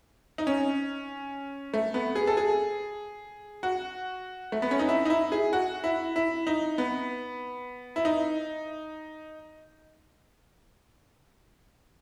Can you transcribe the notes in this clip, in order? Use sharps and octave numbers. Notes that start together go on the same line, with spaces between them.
D#4
C#4
A3
B3
G#4
A4
G#4
F#4
A3
B3
C#4
D#4
E4
D#4
E4
G#4
F#4
E4
E4
D#4
B3
E4
D#4